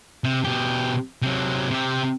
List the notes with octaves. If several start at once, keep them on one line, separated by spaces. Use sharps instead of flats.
C3
B2 G4
C3 F#3
C3 G4